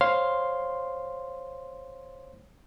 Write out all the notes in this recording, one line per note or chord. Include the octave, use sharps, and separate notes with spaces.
C5 C#5 F5 C6